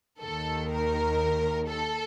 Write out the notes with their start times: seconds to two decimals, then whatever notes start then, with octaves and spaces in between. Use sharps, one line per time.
0.20 D#2 D#3 A4
0.70 A#4
1.68 A4